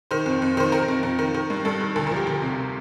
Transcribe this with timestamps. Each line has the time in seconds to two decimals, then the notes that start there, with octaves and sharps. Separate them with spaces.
0.11 D#3 C5
0.26 F2
0.42 F2
0.57 D#3 C5
0.72 D#3 A#4
0.88 F2
1.03 F2
1.19 D#3
1.34 D#3
1.50 G2
1.65 G2 A4
1.80 D#3
1.96 D2 A4
2.07 A#4
2.11 F3
2.16 G4
2.27 D2
2.42 C3